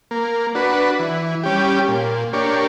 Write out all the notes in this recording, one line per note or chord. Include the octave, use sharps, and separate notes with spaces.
A#3
D4 F#4 B4
E3
G3 C#4 G4
A#2
A#3 D4 G4 C#5